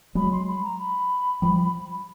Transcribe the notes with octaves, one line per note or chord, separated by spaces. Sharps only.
F#3 G#3 B5
C6
B5
A#5
B5
F3 G3